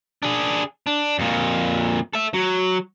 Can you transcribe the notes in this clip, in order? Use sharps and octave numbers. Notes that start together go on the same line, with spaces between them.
D4 G#4
D4
F2 A#2
A4 E5
F#3